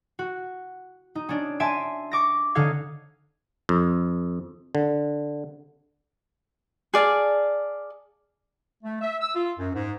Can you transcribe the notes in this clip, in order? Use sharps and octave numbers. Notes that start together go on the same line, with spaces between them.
F#4
D#4
C#4 D4
E5 G#5 A5 C6 D7 D#7
C#6 D6 A#6
D3 C#4 D#4 A4 F5 G#6
F2
D3
G#4 D5 F5 A5
A3
E5
E6
F4
F#2
G#2